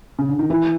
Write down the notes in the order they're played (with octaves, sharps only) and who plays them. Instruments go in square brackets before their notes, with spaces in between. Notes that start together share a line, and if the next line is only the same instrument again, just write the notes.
[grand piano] C#3
D3
D#3
[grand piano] E3 [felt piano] E4